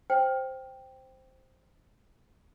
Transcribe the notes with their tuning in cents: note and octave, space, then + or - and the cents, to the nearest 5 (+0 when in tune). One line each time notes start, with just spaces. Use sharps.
C5 +0 G5 +0